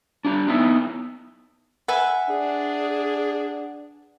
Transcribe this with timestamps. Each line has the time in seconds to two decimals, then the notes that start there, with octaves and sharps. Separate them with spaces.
0.25 D4 G4 A#5
0.48 B3 D#4 E4
1.88 B4 E5 F#5 G#5
2.30 D4 G#4